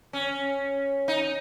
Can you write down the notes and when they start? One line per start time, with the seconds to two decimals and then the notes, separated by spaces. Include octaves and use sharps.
0.13 C#4
1.08 D#4